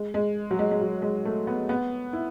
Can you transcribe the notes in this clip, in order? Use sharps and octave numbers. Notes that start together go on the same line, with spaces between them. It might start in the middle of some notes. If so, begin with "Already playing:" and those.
Already playing: G#3
G#3
F#3
G#3
G#3
F#3
G#3
A3
B3
B3
E4